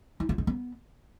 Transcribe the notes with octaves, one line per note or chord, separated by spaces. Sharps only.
E4
F4
D#4
B3